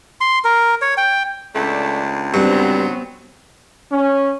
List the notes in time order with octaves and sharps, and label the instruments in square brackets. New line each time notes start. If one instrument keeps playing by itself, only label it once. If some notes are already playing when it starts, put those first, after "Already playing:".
[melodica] C6
A#4
C#5
G5
[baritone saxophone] C#2 [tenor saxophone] A3 [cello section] D4
[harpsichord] G2 [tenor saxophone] F#3 [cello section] B3 C4
[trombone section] C#4